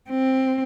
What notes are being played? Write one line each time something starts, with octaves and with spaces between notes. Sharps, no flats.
C4